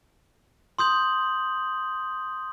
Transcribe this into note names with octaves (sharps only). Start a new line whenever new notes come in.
C6 D#6 G6 F#7